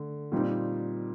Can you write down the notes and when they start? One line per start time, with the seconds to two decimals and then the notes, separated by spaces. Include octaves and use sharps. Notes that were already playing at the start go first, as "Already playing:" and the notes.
Already playing: D3 A3
0.32 A#2 G3 C4 D#4